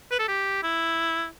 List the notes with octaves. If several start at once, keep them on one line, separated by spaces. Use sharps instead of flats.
B4
A4
G4
E4